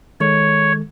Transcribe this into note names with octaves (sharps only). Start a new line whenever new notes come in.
D#3 G#3 A4 C#5